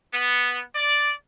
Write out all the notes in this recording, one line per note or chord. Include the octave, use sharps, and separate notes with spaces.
B3
D5